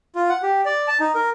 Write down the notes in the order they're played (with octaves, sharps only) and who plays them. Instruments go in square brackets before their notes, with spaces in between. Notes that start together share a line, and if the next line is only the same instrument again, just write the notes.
[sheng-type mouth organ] F4
F#5
G4
D5
A5
D#4
A#4